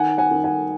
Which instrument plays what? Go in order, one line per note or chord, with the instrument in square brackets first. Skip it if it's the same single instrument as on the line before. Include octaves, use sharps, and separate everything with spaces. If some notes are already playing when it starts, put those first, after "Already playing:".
Already playing: [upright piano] D#3 F#5 G#5
F#5 G#5
D#3
F#5 G#5